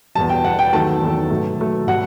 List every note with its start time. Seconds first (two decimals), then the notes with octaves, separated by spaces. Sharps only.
0.15 E2 B2 G3 A5
0.29 G5
0.44 E2 B2 G3 F#5
0.59 G5
0.73 E2 D#3 F#3 A3 A5
1.02 E2 D#3 F#3 A3
1.30 B2 F#3 A3
1.59 B2 F#3 A3
1.87 B2 G3 F#5